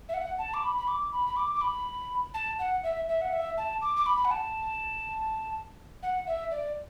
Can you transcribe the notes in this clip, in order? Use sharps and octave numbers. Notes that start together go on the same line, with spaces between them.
E5
F#5
A5
D6
B5
B5
D6
B5
B5
D6
D6
B5
A5
F#5
E5
E5
F#5
E5
A5
D6
D6
B5
F#5
A5
F#5
E5
D5